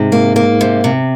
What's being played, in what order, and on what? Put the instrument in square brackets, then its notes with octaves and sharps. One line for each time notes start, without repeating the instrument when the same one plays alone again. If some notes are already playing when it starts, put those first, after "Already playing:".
Already playing: [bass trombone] G#2 [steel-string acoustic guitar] C3
[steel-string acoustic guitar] A#3
A#3
C3
C3